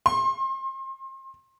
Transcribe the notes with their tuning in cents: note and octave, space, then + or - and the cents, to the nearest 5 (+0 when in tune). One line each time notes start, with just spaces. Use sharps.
C6 +35